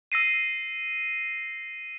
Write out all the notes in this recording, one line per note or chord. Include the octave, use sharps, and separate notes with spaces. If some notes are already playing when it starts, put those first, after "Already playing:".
E6 A#6 C7 D#7